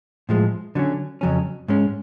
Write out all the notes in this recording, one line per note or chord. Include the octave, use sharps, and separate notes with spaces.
A2 F3 G#3
D3 F#3 C#4
F2 C#3 F#3 C#4
G#2 G#3 C#4